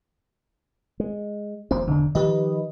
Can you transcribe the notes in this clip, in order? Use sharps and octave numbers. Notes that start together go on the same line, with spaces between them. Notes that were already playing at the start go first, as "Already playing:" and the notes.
G#3
D#1 A#1 C4 C5
E1 D3 D4
D#3 F3 G4 B4 D#5